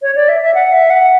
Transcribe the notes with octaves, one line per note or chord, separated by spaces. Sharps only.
C#5
D5
E5
E5
F#5
E5
F#5